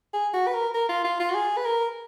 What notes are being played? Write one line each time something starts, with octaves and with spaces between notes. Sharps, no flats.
G#4
F#4
B4
A#4
A#4
F4
F4
F4
F#4
G#4
B4
A#4